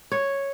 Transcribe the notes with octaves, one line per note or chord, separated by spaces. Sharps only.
C#5